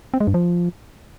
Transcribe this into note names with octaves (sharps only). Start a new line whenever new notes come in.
C4
G#3
G2
F3